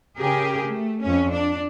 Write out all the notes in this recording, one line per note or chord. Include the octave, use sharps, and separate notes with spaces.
C#3 G4 G#4 A#4
A3
F2 C#4
D4